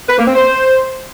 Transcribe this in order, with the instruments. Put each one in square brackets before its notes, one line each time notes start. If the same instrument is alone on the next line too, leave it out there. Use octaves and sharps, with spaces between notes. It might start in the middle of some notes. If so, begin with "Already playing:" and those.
[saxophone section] B4
A#3
C4
C5